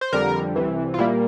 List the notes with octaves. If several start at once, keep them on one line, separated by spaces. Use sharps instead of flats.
C5
F2 D3 G3 A#4
C2 C3 E3
F4
A#2 G3 A#3 E4